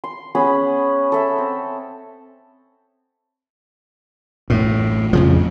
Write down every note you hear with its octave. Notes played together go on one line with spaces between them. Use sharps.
C6
B3 C#4 G#4 B5
A4 E5
C4
A1 F#2 A2 A3
F2 C#3 F3